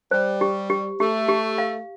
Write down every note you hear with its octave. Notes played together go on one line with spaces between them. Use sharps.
G3 C5
G4
G4
A3 G4
G4
F5